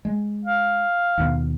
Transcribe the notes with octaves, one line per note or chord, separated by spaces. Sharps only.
G#3
F5
D#2 B2 B3